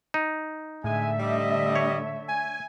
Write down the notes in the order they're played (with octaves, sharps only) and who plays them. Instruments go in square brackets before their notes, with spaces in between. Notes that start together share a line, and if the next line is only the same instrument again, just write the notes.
[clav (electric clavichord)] D#4
[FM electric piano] A2 [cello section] D3 A3 E5 [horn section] G#3 G#5
[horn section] G3 D#5
[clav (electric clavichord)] C#5
[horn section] G#5